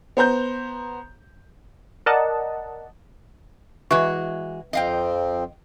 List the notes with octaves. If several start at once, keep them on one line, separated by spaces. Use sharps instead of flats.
B3 C5 A#5 G6
A#4 D5 D#5 F#5 A5
E3 G#3 F#4 B4 E5 C#6
F2 F3 C4 D#5 F5 G5